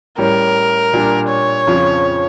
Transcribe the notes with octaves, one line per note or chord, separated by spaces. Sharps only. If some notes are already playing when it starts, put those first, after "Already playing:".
A2 G3 C#4 A#4
A#2 G3 D4
C#5
F2 C#3 F3